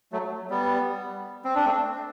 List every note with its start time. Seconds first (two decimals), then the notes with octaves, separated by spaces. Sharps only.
0.12 F#3 A3
0.50 G3 B3
1.45 C4
1.55 D4
1.65 A3 C4